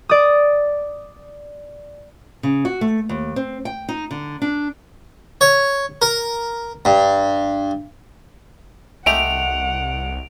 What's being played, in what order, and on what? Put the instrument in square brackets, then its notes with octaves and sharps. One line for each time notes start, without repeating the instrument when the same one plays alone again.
[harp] D5 D#6
[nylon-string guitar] C#3
F#4
A3
D#2
C4
G5
D#4
D3
D4
[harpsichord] C#5
A#4
G2
[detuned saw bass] C2 [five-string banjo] G#3 A3 G4 [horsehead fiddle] F#5 [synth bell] D7 F7